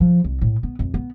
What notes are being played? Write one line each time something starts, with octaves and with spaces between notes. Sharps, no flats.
F3
C2
A2
B3
F2
B3